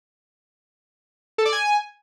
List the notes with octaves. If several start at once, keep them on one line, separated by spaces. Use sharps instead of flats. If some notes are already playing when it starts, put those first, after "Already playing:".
A4
D5
G#5